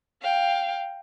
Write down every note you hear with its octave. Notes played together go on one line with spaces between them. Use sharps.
F5 G5